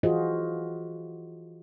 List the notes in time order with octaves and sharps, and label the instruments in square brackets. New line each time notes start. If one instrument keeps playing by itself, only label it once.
[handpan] E3 F4 F#4 G#4 C5 D#5